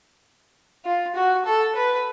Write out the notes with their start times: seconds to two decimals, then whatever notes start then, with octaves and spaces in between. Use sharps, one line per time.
0.85 F4
1.15 F#4
1.45 A4
1.75 B4